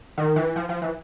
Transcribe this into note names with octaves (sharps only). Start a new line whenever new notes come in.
D#3
E3
F3
F3
E3